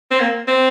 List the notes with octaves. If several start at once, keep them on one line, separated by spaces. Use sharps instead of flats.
C4
A#3
C4